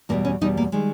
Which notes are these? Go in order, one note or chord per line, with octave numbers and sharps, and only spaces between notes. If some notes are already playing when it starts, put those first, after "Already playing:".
E2 B2 G3 A#3
C#4
E2 B2 G3 D#4
A#3
D#3 G3 G#3